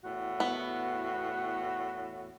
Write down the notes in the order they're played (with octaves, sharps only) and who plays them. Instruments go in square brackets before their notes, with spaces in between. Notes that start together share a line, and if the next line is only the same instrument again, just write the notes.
[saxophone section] E2 A2 F#4
[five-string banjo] B3